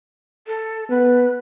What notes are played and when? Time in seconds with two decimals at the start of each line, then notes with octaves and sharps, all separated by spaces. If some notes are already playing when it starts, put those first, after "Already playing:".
0.47 A4
0.89 B3 B4